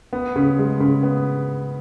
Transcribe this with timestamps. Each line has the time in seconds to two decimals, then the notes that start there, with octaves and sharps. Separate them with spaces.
0.13 B3
0.36 C#3
0.59 G#3
0.80 C#3
1.03 B3